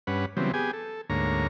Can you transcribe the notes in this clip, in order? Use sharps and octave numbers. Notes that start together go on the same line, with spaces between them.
G2 C#4 B4 F#5
C#3 E3 F#3 G3 B3 C4
B3 G4 G#4 G#5
A4
D2 G#2 A#3 C#5 A#5